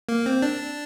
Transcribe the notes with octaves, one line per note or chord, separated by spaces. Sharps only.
A#3
C4
D4